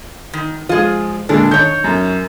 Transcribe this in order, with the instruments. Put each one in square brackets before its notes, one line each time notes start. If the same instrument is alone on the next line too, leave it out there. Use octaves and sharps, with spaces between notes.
[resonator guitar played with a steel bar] D#3
[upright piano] F3 G#3 [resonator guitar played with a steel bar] F4 G#4
[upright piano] A#2 D3 G#3 [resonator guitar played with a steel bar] D4
[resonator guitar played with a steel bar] D#3 C#5 [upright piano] C#6 G6
[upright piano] F#2